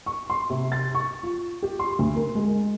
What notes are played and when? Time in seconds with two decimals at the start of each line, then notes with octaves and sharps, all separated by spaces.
0.06 C#6
0.30 C6
0.50 C3
0.72 A6
0.95 C#6
1.23 F4
1.63 G4
1.79 C6
1.99 D2
2.16 A#4
2.35 G#3